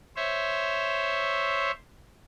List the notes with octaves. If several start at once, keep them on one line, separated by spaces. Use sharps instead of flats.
C5 C#5 E5